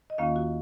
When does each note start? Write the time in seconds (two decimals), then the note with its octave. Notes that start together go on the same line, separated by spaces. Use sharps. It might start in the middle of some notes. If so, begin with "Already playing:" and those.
0.10 D#5
0.18 D#2 D#3 A#3 C#4 F4 F5
0.36 F#4